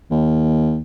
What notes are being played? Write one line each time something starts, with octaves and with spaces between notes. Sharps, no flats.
D#2